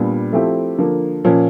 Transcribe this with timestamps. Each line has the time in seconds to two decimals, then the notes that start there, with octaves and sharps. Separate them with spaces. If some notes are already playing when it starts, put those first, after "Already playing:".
Already playing: A#2 G3 B3 D4
0.33 F3 A3 C4 E4 G4
0.78 D3 F3 A#3
1.24 A#2 F3 A#3 C#4